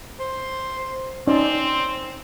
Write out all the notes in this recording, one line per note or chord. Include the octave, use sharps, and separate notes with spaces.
C5
C4 C#4 D#4 C5 D5